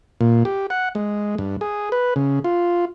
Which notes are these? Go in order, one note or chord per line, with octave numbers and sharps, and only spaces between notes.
A#2
G4
F#5
G#3
G2
G#4
B4
C#3
F4